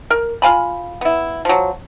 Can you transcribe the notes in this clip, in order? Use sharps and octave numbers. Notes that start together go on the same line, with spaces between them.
A#4
F4 F5 G#5 B5
B3 E4
F3 F#3